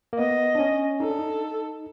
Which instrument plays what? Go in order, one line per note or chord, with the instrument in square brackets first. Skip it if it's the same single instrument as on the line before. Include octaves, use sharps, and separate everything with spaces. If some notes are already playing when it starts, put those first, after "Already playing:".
[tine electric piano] A#3
[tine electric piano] B3 [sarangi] D#5
[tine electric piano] D4
C#4
[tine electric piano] D#4 [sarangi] A4
[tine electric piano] D4
D#4